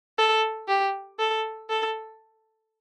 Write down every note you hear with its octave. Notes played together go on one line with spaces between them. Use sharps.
A4
G4
A4
A4